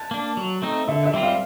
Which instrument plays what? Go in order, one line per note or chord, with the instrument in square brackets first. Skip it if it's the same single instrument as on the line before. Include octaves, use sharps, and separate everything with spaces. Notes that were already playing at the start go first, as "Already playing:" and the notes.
Already playing: [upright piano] A5
[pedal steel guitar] A#3 D4
F#3
A3 C4 D#4
[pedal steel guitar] D3 [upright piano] E5
[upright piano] E5
[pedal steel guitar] G3 C4 F4
[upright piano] F5